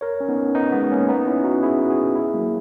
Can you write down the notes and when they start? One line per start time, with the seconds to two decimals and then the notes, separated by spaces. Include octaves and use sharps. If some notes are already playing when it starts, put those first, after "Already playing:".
0.01 A#4 C#5
0.20 C#4
0.29 B3 D#4
0.55 B3 D#4
0.73 G#3 B3
0.92 A#3 C#4
1.09 B3 D#4
1.26 C#4 E4
1.44 D#4 F#4
1.63 E4 G#4
1.81 F#4
1.90 E4 G#4
2.15 E4 G#4
2.33 F#3 A#3